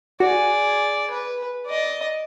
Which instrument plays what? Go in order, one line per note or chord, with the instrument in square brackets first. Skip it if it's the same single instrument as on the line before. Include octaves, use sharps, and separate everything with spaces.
[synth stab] F#4 [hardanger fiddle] G#4 D5
[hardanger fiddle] B4
D5 D#5